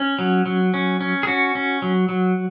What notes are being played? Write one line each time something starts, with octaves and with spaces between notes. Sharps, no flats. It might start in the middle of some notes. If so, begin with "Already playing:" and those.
Already playing: C#4
F#3
F#3
C#4
C#4
G#4
C#4 F#4
C#4
F#3
F#3